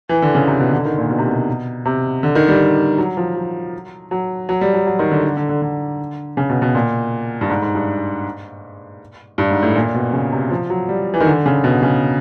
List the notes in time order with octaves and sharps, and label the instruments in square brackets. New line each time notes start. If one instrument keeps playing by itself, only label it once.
[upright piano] E3
D3
C#3
C3
B2
D3
D#3
A#2
B2
C3
B2
C3
D3
D#3
G3
F#3
F3
F#3
F#3
F#3
G3
F#3
F#3
D#3
D3
D3
D3
D3
D3
C#3
B2
B2
A#2
G2
G#2
G#2
G2
G2
G#2
A2
A#2
B2
C#3
C3
F3
F#3
G3
E3
D#3
D3
C#3
B2
C#3